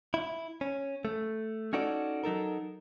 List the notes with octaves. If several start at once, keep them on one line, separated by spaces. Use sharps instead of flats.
E4
C#4
A3
C#4 D#4 F#4 A4 D5
F#3 D#4 A4 A#4